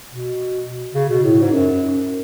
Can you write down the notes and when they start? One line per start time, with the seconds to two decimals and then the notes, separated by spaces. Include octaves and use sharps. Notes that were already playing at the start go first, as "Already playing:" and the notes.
0.09 B2
0.95 C#3
1.09 B2
1.23 A2
1.42 G#2
1.51 F#2